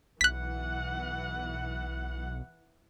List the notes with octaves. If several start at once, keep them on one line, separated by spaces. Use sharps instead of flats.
B1 E3 F#5 F#6 B6